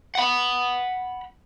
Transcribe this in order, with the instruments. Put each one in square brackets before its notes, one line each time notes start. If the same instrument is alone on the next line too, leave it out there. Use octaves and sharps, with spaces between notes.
[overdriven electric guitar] F#5 B5